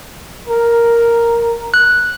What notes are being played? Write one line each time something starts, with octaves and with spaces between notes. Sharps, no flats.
A#4
F#6